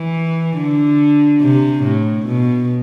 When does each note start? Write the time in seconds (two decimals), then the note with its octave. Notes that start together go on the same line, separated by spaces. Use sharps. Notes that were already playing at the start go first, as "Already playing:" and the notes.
Already playing: E3
0.58 D3
1.41 C3
1.83 A2
2.25 B2